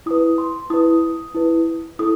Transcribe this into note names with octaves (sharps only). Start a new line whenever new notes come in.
E4 B4 D#6
C6
E4 B4 D#6
E4 B4
E4 A4 D#6